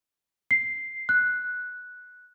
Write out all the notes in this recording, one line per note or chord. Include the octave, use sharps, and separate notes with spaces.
C7
F#6